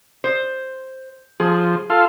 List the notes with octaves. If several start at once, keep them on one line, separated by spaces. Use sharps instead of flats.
C5
F3 G#4
F4 A4 F5